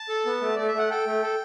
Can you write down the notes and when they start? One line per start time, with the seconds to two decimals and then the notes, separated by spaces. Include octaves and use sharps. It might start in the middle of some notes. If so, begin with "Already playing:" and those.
Already playing: A5
0.09 A4
0.26 B3
0.42 A3
0.56 A3 D5
0.67 E5
0.74 A3 F#5
0.90 A4 G5
1.07 A3
1.23 A4